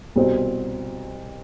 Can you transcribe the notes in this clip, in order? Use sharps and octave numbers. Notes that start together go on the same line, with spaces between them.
C2 B2 G3 C4